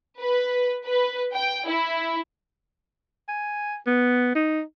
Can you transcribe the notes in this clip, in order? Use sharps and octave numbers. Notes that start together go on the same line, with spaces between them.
B4
B4
G5
E4
G#5
B3
D#4